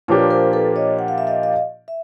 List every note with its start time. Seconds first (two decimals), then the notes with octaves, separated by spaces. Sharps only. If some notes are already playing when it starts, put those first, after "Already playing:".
0.08 A#2 F3 A#3 D4 G4 B4 C#5
0.30 A#4 C5
0.53 A4 B4
0.76 C#5 D#5
0.99 F#5
1.08 F5
1.18 E5
1.27 D#5 F5
1.43 D#5 F5
1.88 E5